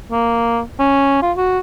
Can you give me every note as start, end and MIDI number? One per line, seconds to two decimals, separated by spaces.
0.12 0.60 58
0.79 1.22 61
1.22 1.32 65
1.37 1.59 66